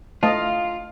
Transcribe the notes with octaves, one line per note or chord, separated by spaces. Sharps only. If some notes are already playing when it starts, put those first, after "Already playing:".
A3 F4 D#5 F5 A5